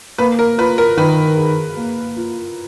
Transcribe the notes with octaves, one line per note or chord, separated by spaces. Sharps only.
A#3 B4
A#4
F4 B4
A#4
D#3 B4
G#4
A#3
F4